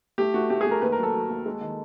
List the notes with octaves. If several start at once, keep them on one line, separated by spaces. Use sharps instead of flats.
A3 G4
A3 F#4
A3 G4
G#4
A3 A#4
D#2 B4
A#4
F#3
A4
F#3
D#2
G#3
D#3